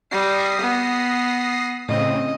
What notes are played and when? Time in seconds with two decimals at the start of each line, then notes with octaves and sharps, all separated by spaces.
0.11 G3 D#6 A#6 C7
0.60 B3
1.88 A2 C#3 C4 D#5